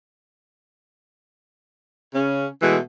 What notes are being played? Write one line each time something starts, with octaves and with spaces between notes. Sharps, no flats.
C#3 C#4
B2 E3 G#3 A3 F#4